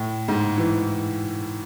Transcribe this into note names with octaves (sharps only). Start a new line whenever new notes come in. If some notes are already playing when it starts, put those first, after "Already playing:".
Already playing: A2
G#2
E3